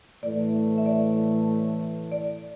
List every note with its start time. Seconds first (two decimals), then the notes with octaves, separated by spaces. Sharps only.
0.23 A2 E3 A3 D5
0.78 E5
0.86 D5
2.12 D5